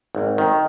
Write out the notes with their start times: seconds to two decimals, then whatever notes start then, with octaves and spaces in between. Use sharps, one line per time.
0.15 G#1
0.38 D#3